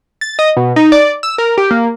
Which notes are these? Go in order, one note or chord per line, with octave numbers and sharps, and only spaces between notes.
A6
D#5
B2
D#4
D5
E6
A#4
G4
A#3